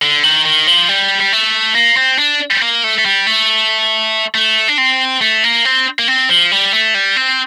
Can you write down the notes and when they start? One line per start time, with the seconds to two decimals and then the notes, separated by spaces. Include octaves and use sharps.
0.02 D3
0.23 D#3
0.45 D#3
0.67 F3
0.89 G3
1.20 G3
1.33 A3
1.75 A#3
1.97 C4
2.19 D4
2.62 A#3
2.84 A3
2.98 A3
3.06 G3
3.27 A3
4.35 A3
4.68 D4
4.78 C4
5.21 A3
5.44 A#3
5.65 C4
5.99 A#3
6.08 C4
6.30 F3
6.52 G3
6.72 A3
6.94 G3
7.16 C4